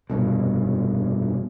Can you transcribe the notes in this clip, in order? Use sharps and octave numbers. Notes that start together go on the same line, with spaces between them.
F1 G2 B2